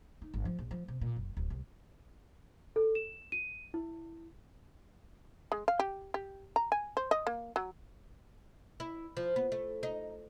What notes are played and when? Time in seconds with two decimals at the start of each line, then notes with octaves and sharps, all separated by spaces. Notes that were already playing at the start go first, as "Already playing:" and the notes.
0.22 D#4
0.34 G1
0.45 F3
0.59 A#1
0.71 F3
0.88 C3
1.01 A#2
1.16 F#1
1.37 D1
1.50 C2
2.76 A4
2.95 E7
3.32 D#7
3.74 E4
5.52 G#3
5.68 F5
5.79 G4
6.14 G4
6.56 A#5
6.72 G#5
6.97 C5
7.11 D#5
7.27 A#3
7.56 F#3
8.80 E4
9.17 F3
9.36 B3
9.52 A3
9.83 D#4